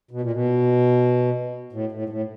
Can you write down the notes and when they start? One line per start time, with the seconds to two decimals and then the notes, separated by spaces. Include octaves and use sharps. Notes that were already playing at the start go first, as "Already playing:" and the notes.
0.11 B2
0.21 A#2
0.31 B2
1.73 A2
1.91 A2
2.02 G#2
2.09 A2